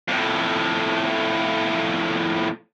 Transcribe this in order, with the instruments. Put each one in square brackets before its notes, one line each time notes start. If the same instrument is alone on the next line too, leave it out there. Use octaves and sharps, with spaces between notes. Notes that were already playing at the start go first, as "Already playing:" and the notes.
[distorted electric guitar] F2 A2